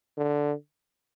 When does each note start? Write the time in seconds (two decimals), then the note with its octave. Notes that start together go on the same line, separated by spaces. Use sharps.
0.18 D3